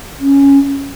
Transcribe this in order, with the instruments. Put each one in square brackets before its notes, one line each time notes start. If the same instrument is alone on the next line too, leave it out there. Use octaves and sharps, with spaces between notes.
[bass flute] C#4